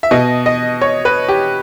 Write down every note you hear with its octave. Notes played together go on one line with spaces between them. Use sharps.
E5
B2 D#5
D#5
C#5
B4
G4